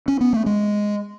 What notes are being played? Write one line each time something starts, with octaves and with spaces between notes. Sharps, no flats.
C#4
B3
A3
G#3